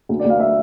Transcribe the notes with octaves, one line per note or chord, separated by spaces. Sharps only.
D2
D5
D2
F5
E5